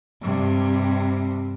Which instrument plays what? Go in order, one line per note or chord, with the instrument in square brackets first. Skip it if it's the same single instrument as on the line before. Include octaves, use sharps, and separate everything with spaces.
[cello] G2 C3